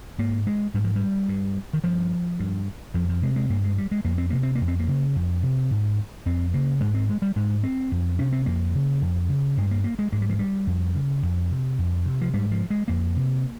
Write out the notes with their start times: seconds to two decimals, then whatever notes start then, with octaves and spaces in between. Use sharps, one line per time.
0.18 G#2 A#3
0.47 G#3
0.74 G#2 G3
0.84 F3
0.95 G3
1.28 G2
1.73 D#3
1.84 G2 F3
2.40 G2
2.94 F2 F3
3.09 F3
3.22 C3 G#3
3.36 G#3
3.49 G2 A#3
3.64 G#3
3.78 G3
3.91 G#3
4.05 F2 A#3
4.18 C4
4.30 C3 A#3
4.43 C4
4.55 A#3
4.61 F2
4.68 C4
4.79 A#3
4.88 C#3
5.16 F2
5.43 C3
5.71 G#2
6.26 F2 C4
6.54 C#3 A#3
6.81 G#2 G#3
6.94 C4
7.09 G#3
7.22 G3
7.36 G#2 G#3
7.64 C4
7.92 F2
8.19 C3 C#4
8.33 C4
8.46 F2 A#3
8.75 C#3
9.02 F2
9.29 C#3
9.57 G2 G#3
9.71 A#3
9.84 A#3
9.99 G#3
10.12 G#2 G#3
10.22 G3
10.30 F3
10.39 G3
10.67 F2
10.95 C#3
11.23 F2
11.51 C3
11.79 F2
12.06 C3
12.21 F3
12.34 G#2 G3
12.51 F3
12.70 G#3
12.88 F2 A#3
13.16 C3